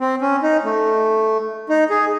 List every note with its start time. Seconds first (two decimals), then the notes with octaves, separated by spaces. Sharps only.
0.01 C4
0.22 C#4
0.43 D#4
0.64 A3
1.70 D#4
1.90 G#4